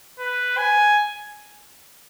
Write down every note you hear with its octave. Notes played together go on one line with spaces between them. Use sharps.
B4
G#5